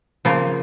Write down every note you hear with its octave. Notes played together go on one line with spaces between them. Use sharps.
C#3 F3 A#3 F4